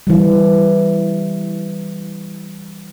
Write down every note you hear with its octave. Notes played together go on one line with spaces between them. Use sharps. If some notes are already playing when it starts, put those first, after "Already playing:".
E3 G3